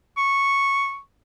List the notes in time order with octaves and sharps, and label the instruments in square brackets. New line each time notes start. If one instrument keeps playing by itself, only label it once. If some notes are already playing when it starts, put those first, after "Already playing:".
[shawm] C#6